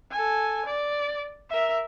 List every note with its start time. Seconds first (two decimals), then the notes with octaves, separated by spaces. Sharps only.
0.11 A4 G#5
0.66 D5
1.50 A#4 E5